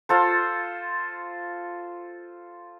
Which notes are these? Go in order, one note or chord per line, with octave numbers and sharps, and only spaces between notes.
F4 A4 C5